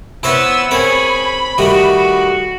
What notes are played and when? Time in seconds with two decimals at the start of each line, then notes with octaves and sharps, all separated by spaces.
0.23 B3 E4 C5 C#5 E6
0.71 C4 G#4 A#4 C#5 B5
1.58 D#3 G3 A3 F#4